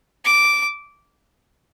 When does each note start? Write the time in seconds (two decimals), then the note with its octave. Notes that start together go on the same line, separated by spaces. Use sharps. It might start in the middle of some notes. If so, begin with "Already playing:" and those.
0.24 D6